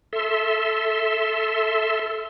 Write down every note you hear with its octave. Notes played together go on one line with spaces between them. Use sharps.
A4 E5 C6